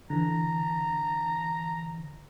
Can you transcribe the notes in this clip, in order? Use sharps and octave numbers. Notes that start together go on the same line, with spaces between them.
D3 E3 A#5